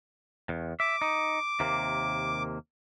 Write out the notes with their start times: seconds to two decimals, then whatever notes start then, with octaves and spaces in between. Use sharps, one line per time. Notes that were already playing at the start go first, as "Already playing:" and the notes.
0.49 E2
0.80 E5 D6
1.02 D#4
1.60 D#2 C3 A#3